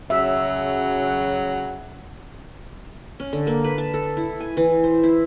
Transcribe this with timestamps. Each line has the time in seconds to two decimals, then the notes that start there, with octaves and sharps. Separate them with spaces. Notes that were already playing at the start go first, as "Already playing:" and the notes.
0.10 C#3 F#3 E5
3.20 C#4
3.33 D3
3.47 A#3
3.64 B4
3.78 A5
3.94 A4
4.17 E4
4.40 G#5
4.57 E3
4.84 C5
5.03 E4